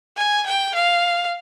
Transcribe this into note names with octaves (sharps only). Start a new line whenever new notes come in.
G#5
G5
F5